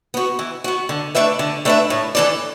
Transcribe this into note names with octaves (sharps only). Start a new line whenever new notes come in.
B3 F#4
E3
B3 F#4
D3
A3 D4 B4 E5
D3
A3 D4 B4 E5
A2
E3 D4 A4 D5